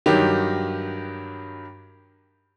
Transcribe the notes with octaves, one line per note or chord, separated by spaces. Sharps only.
G2 D#3 F#3 G4